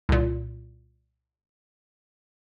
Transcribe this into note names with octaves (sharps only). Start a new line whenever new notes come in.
C2 A#2